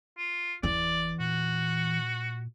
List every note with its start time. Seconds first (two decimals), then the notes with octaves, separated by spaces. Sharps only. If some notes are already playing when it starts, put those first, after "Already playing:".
0.18 F4
0.63 F#1 E2 E3 D5
1.20 A#2 F#4